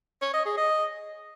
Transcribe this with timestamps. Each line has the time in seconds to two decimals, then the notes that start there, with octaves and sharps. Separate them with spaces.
0.22 C#5
0.34 D#5
0.45 G#4
0.57 D#5